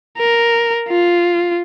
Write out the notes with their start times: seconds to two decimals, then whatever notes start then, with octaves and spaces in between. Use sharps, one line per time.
0.18 A#4
0.89 F4